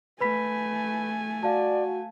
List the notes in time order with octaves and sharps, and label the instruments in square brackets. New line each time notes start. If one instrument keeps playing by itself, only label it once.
[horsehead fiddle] A3 G#5 [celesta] B4 B5 B6
[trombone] F#4 [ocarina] D5 [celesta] F5 A5